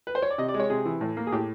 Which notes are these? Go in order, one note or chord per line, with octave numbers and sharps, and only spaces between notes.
B4
C5
C#5
D5
C3 D#5
D5
G#3
C#5
C3 G#4
E3
A2
A#3
G#4
A2 G4